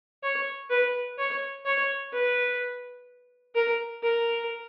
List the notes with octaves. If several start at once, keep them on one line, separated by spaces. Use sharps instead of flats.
C#5
B4
C#5
C#5
B4
A#4
A#4